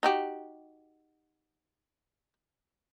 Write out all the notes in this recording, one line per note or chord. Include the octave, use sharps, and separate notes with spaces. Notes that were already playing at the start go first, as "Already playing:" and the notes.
D#4 F#4 G4